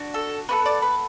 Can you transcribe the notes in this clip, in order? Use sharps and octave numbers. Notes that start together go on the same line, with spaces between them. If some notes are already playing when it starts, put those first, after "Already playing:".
Already playing: D4 F#4
A4
B3 F#4 A4 B4
D5
B4